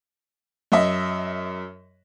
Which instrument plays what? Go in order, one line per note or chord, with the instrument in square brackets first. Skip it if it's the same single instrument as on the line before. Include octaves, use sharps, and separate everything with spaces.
[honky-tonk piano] F#2 D#5 E5